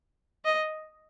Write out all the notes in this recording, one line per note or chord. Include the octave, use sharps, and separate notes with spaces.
D#5